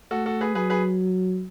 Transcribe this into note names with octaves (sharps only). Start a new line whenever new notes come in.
A3 F#4 A4
F#4 A4
G#4 B4
F#3 G#4 B4
G#4 B4